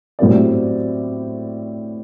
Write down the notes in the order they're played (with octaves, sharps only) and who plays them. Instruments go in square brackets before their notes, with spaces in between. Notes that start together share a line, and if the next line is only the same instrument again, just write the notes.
[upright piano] A2 F#3 C4 G4 D5